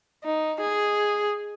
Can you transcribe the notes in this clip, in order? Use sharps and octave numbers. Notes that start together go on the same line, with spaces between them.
D#4
G#4